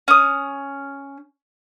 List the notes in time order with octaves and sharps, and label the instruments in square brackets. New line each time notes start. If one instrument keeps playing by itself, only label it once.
[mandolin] C#4 D#6